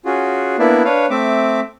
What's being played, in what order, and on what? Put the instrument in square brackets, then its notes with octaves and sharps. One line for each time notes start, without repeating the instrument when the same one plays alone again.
[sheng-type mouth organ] C#4 F4 F#4 G#4
A#3 B3 D4 E4 D5 E5
D4 B4 C#5 F5
A3 C4 E5 D6